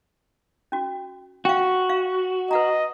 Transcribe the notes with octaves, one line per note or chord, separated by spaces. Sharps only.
C#4 F#4
F#4 F5 G5
F5
B4 D#5 F#5 A#5